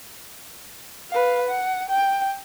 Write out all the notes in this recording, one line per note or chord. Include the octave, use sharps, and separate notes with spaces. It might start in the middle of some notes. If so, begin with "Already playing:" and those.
B4 F5
F#5
G5